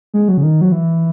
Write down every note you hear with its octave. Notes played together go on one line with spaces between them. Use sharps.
G#3
F#3
C#3
D#3
F#3
E3